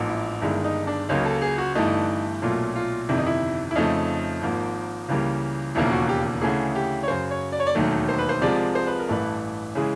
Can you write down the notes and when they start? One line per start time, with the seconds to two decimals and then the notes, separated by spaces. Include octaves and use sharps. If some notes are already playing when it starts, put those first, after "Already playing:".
Already playing: A1 G#2 F3 A#3
0.08 E4
0.42 G1 G2 D#3 G#3 E4
0.64 D#4
0.87 D4
1.09 C#2 C#3 F#3 A#3 D#4
1.25 A4
1.42 G#4
1.58 F#4
1.75 G1 G2 E3 A3 D#4
2.42 B1 A#2 F#3 A3 F4
2.76 F4
3.09 G1 F2 C3 D#3 E4
3.18 D#4
3.27 E4
3.71 E4
3.76 F2 C#3 F3 A3 D#4
4.42 G#1 G#2 F3 A#3
5.08 C#2 C#3 E3 G3 A#3
5.75 E1 D#2 C#3 F3 A#3 E4
5.91 F#4
6.09 G4
6.41 D2 C#3 E3 A3 G#4
6.75 G4
7.03 C#5
7.08 F#2 C#3 F#3 C5
7.31 C#5
7.52 D5
7.60 C#5
7.67 D5
7.75 E1 D#2 D#3 F#3 A3
8.09 C5
8.19 B4
8.29 C5
8.42 C2 C3 F3 G#3 D5
8.75 C5
8.87 B4
8.99 A#4
9.08 A1 G2 E3 A3 B4
9.75 C#3 E3 G#3